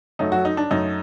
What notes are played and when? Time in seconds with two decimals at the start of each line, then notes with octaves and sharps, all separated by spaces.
0.19 F#2 F#3 A3 D#4
0.32 F#3 F#4
0.45 D#4
0.57 D4
0.70 F#2 F#3 A3 D#4